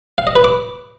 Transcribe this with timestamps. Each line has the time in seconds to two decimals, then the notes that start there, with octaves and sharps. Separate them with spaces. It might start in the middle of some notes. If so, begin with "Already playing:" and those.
0.18 F5
0.27 D#5
0.36 B4
0.44 D6